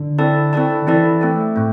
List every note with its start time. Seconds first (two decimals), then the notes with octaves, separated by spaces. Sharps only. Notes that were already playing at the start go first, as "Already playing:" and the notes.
Already playing: D3
0.18 C4 E4 A4 D5 A5
0.53 C4 E4 A4 D5 A5
0.82 D3
0.87 E3 C4 E4 A4 D5 A5
1.21 A3 C4 A4
1.56 A2 A3 C4